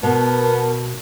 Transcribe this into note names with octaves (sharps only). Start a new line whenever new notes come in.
B2 B3 A#4 A5